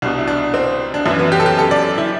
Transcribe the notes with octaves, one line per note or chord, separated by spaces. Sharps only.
C2 B2 D4
E4
D4
C4
D4
F#2 E3 E4
B3
G4
A4
G4
A4
D5
E4